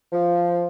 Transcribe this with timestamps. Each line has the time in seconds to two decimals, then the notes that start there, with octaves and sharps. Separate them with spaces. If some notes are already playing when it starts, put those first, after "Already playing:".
0.12 F3